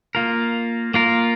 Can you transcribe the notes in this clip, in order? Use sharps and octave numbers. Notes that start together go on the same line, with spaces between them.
A#3 F4 A#4
A#3 F4 A#4